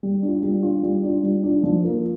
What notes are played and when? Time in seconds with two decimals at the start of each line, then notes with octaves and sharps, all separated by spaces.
0.03 G3
0.22 D4
0.28 F4
0.43 G3
0.63 D4 F4
0.83 G3
1.03 D4 F4
1.23 G3
1.43 D4 F4
1.63 F3
1.83 A#3 F4 A#4